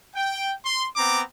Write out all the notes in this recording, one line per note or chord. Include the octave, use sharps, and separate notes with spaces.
G5
C6
B3 C4 A#5 D6